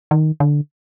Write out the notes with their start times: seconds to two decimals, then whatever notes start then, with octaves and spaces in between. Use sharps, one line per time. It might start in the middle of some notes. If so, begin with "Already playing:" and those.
0.11 D#3
0.40 D3